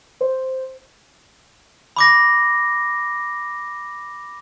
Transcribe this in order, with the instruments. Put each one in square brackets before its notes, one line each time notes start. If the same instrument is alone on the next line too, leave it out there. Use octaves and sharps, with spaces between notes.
[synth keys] C5
[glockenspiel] B5 D6 A#6